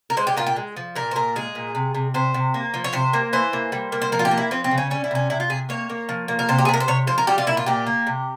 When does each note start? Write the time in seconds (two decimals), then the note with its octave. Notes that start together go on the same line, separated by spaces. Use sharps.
0.10 A#4
0.17 G#3 C5
0.27 G4
0.37 A#2 F4
0.47 G4
0.56 G#3
0.77 F3
0.95 A#2 A#4
1.11 C5
1.15 A#2 A#4
1.35 G#3 G#4
1.55 A#2
1.75 C3
1.95 C3
2.14 C3 C5
2.34 C3
2.54 A#3
2.74 F3
2.84 C#5
2.93 C3 C5
3.13 A#3
3.33 E3 C5
3.53 A#3
3.72 G3
3.92 A#3
4.02 C5
4.12 F3 A#4
4.19 F4
4.25 G4
4.31 A#3
4.38 E4
4.51 F3 C4
4.64 C4
4.71 C#3
4.78 C#4
4.90 G3 C#4
5.04 E4
5.11 C3 C#4
5.30 C3 E4
5.40 F4
5.50 C3 G#4
5.69 A#3 C#5
5.89 A#3
6.09 F3
6.28 A#3
6.39 A#4
6.49 C3 C5
6.58 G4
6.65 G#4
6.68 C3
6.74 A#4
6.80 C5
6.88 C3 C#5
7.07 F3 C5
7.18 A#4
7.27 G3 G4
7.38 F4
7.47 A#2 E4
7.57 F4
7.66 A#2 G4
7.87 A#3
8.07 C3